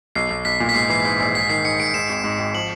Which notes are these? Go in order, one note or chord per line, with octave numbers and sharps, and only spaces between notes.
B1 C7
B1
B1 B6
A#2
B6
G#2 C7
E3 C7
G#2
A#1
G#2 B6
D#3 C7
G#2 C#7
G#2 D7
G#2 E7
G#1
G#2
G#1
F3 F#7